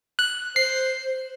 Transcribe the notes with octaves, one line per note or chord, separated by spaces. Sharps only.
F#6
C5 C7